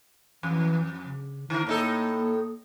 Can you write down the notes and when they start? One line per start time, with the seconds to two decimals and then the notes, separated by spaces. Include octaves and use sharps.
0.43 F2 E3
1.05 C#3
1.50 D3 E4 A#4
1.67 A2 A#3 D#4 A4